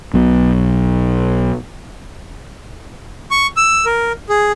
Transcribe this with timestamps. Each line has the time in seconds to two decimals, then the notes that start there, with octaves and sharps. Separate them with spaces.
0.14 B1 B2
3.31 C#6
3.57 E6
3.86 A#4
4.29 G#4